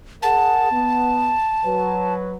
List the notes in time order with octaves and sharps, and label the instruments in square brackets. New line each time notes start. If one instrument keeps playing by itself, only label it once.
[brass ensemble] G#4 A#4 F#5 [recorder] A5
[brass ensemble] B3
F#3 B4